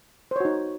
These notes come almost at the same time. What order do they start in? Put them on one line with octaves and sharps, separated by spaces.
C5 C#5 F#4 D#4